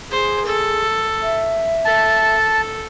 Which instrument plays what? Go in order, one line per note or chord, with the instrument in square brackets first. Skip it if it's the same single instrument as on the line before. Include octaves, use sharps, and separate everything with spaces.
[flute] G#4 [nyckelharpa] C5
[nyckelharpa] A4
[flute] E5
[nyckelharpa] A4 [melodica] A5